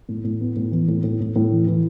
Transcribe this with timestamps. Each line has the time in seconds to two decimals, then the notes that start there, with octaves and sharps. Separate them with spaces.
0.09 A2
0.24 A2
0.41 B3
0.56 A2
0.72 E3
0.88 A2
1.04 A2
1.20 A2
1.36 A2
1.52 E3
1.67 E3